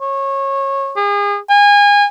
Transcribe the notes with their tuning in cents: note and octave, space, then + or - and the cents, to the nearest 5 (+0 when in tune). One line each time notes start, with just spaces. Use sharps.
C#5 -20
G#4 -35
G#5 -30